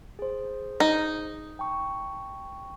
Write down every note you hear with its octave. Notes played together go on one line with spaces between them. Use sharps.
G#4 C5
D#4
G5 A5 C#6